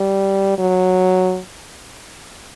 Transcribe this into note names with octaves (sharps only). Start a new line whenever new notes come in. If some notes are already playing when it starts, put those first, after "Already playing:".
Already playing: G3
F#3